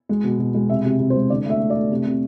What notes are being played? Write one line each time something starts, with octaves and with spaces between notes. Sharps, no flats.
G#3
B2
B2
G#3
C3 E5
C3
C3
C5
G#3
D3 D5
A3 E5
A3
D5
A3
C3
C3